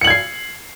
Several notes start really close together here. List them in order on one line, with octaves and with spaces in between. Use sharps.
C#7 F#7 G#6 C7